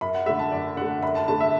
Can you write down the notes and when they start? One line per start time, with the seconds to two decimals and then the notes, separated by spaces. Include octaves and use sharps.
0.01 F#2 B5
0.14 F#5
0.26 D3 A3 E5
0.39 A5
0.52 F#2 D5
0.77 D3 A3 F#5
1.02 F#2 B5
1.15 A5
1.28 D3 A3 A5
1.41 E5